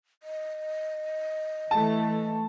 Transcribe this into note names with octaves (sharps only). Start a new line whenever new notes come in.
D#5
E3 A3 A5